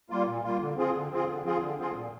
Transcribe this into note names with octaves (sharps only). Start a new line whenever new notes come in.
G3 A#3 F4
A#2
G3 A#3 F4
D3
F3 C4 F4 G#4
D3
F3 C4 F4 G#4
D3
F3 C4 F4 G#4
D3
F3 C4 F4 G#4
A#2